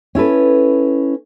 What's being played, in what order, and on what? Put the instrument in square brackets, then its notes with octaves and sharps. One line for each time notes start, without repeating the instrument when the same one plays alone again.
[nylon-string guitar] C#4 E4 A4 B4